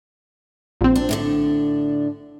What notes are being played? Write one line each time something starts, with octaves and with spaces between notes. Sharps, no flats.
A#1 C4
D4
A2 D3 D4